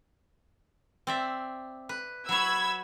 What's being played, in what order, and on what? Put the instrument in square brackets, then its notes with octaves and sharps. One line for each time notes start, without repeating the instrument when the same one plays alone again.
[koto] C4 D5 E5
B4
[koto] F#3 C#5 [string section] B5 E6 G#6